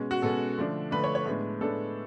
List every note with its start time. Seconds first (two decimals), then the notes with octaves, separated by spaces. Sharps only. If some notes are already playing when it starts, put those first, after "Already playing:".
Already playing: B2 G#3 C#4
0.11 F#4
0.22 B2 G#3 C#4 A4
0.57 D3 F3 A3 D4
0.91 D3 F3 A3 D4 B4
1.04 C#5
1.15 C#5
1.26 A2 G#3 B3 D4
1.61 A2 G#3 B3 D4 A4